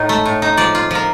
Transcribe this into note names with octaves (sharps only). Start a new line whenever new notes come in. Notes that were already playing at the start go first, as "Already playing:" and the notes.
Already playing: A2 D#4
A3
A2
D#4
F3 D5
F4
F3 A#4